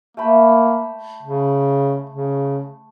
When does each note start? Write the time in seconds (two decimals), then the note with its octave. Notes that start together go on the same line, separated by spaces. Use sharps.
0.17 A3 A#3 G5 B5
1.22 C#3
2.10 C#3